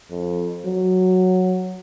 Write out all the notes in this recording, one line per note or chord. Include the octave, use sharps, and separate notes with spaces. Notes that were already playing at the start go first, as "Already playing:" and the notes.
F2
F#3